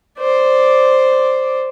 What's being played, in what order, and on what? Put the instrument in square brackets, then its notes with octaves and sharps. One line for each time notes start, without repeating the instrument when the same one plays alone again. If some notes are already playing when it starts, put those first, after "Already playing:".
[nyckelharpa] C5 D5